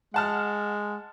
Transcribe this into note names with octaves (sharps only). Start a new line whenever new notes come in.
G#3 F#5 A5 F6